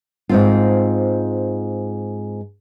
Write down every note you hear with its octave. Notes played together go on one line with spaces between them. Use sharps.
G#2 C4 F4